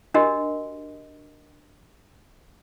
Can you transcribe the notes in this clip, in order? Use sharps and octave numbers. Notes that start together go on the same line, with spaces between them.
D4 F#4 G4 A#4 D#5